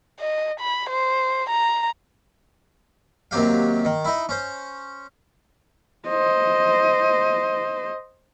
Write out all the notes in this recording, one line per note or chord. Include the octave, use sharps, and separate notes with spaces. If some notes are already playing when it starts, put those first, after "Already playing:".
D#5
B5
C5
A#5
D#2 C3 F#3 G4 F5
D#3
D#4 E4
C#4 C5
C5 D#5